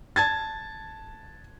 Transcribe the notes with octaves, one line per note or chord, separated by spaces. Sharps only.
A5 G#6 A6